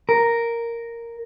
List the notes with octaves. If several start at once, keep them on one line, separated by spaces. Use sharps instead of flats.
A#4